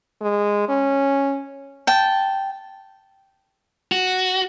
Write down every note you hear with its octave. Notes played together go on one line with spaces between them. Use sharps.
G#3
C#4
G5 A5
F#4